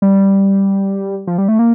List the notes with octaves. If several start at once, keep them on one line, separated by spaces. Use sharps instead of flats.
G3
F3
G3
A3
A#3